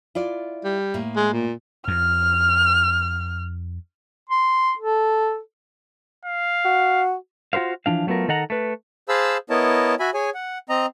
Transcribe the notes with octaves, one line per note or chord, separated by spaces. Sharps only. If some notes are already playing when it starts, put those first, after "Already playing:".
E4 F4 D5
G3
A2 A#3
G#3
A#2
F2 F6
C6
A4
F5
F#4
F4 F#4 B4 C5 F5
E3 F3 D4 F5
F#3 A3 B3 F4 A#4
D#3 A4 D#5 F#5 A#5
A3 B4
G#4 C5 F5 A5 B5 E6
B3 E4 A#4 C#5 D#5 A5
F#4 E5 G#5 B5
G#4 C#5 G#5
F#5
C4 D#5 A#5